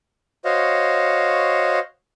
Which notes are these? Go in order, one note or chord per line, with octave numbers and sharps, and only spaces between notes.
F#4 C5 C#5 D#5 F5